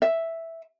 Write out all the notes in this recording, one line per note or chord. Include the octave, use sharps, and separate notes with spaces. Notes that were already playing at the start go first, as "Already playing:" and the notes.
E5